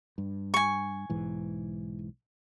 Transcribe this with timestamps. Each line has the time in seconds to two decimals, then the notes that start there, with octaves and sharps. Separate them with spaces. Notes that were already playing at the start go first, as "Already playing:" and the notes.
0.18 G2
0.54 G#5 C#6
1.10 B1 G#2 E3